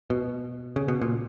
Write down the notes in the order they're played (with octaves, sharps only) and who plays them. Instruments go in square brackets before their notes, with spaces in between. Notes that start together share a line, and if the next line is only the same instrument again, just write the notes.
[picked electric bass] B2
C#3
B2
A#2